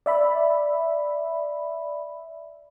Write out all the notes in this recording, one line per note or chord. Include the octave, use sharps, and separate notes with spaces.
D5 E5 B5